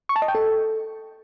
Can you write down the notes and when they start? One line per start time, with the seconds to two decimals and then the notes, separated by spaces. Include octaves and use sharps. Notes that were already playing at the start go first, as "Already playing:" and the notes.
0.09 C#6
0.16 A5
0.22 D#5
0.28 G5
0.35 A4